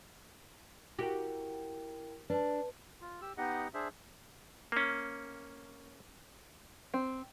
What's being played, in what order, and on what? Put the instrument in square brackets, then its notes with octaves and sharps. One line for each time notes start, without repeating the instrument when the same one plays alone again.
[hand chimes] E4 A#4 G5 [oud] F#4 G4
[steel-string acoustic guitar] D4 [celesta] B4 A5
[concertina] F4
G4 E6
B3 D#4 G4 D#5 F#5
D4 G#4 C5 E5
[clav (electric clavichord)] A#3 C#4
[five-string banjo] C4